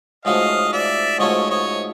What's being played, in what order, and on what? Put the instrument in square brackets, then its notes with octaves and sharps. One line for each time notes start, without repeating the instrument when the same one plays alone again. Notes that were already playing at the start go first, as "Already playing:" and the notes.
[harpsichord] G#2 F3 A3 C#4 F#4 [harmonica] D#5 F5
[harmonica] D5 E5
[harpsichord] G#2 F3 A3 C#4 F#4 [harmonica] C#5 D#5
[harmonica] C#5 D#5